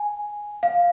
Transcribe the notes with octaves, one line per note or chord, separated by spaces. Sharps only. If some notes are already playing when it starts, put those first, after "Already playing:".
Already playing: G#5
F5